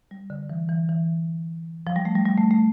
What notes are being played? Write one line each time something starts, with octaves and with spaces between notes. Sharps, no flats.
G3
D3
E3
E3
E3
F3
G3
A3
G3
G3
A3
A3